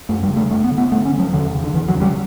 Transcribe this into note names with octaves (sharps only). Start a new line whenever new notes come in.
F#2 A3
G3
C#3
A3
G2 A3
B3
D3
B3
G2 A3
C#4
D3
F#3
E2 D3
C#3
D3
E2 E3
F#3
C#3
G3